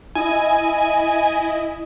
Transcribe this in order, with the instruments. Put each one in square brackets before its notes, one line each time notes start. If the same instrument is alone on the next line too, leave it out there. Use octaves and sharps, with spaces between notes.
[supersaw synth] E4 D#5 [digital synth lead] G#5